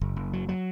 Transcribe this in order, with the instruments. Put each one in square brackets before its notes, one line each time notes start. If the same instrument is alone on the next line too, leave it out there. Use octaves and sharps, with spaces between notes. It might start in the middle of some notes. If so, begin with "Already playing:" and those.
[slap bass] F#1
F#1
F#3
F#3